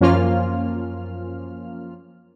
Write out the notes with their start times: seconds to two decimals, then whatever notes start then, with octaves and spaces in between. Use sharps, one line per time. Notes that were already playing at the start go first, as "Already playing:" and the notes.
0.01 F#2 F3 A#3 C#4 F4 F6